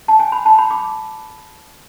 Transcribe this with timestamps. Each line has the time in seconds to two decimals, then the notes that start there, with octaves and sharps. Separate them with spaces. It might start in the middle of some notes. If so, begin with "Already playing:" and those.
0.08 A5
0.20 G#5
0.32 B5
0.46 A5
0.58 B5
0.71 D6